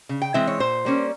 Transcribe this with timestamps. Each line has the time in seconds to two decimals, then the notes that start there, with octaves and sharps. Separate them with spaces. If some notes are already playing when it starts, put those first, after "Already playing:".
0.09 C#3
0.22 G5
0.34 E3 G#3 C4 E5
0.47 C#5
0.60 A#2 C5
0.85 G3 A#3 C#4